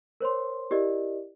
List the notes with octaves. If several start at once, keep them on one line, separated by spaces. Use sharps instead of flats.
A#4 C5 C#5 C6
E4 G4 A#4 D5 D#5